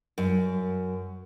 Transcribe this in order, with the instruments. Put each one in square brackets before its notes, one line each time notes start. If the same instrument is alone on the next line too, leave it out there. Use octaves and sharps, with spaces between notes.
[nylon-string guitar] F#2